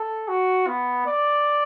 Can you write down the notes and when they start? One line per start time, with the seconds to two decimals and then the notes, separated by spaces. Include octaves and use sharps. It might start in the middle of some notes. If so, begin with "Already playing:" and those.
Already playing: A4
0.28 F#4
0.67 B3
1.06 D5